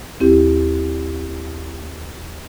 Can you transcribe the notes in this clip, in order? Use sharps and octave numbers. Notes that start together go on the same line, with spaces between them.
D#2 C4 E4 G4